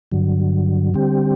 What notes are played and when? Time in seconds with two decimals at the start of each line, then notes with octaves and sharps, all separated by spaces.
0.12 G2 D3 F#3
0.94 D3 G3 C4 G4